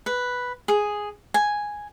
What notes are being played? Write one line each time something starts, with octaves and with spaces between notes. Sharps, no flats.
B4
G#4
G#5